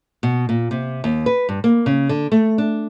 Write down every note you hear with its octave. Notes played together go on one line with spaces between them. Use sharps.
B2
A#2
C3
D#2
B4
G2
A#3
C#3
D3
A3
D4